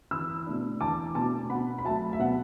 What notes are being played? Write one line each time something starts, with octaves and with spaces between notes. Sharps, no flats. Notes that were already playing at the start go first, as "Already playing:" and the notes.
E2 B5 E6
B2 A3 D4
E2 A5 D6
B2 A3 D4 A5 D6
B2 F#5 B5
B5
F#3 A3 E5 A5
E5
B2 F#5